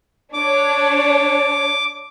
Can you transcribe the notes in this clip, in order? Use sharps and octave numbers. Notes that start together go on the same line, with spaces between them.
D4 C#5 D6